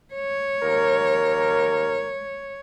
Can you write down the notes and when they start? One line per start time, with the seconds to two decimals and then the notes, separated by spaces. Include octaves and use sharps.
0.14 C#5
0.61 D#2 A#4